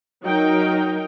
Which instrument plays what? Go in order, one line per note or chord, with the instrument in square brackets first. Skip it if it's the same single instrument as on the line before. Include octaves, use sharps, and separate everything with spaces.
[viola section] F#3 D#4 A#4 G5